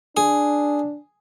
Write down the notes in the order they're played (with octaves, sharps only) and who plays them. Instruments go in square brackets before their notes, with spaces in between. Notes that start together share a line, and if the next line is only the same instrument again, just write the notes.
[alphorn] D4 [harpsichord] G#4